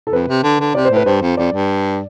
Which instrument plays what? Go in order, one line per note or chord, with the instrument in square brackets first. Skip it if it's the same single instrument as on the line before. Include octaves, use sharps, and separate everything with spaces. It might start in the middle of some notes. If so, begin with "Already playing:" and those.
[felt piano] A4
[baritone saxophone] F2 [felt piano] B4
[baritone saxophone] C3
D3
D3
[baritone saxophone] C3 [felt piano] D5
[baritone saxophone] A2 [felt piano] C5
[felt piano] B4
[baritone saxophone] G2 [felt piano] C5
[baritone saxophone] F2
[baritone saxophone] F2 [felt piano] D5
[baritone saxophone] G2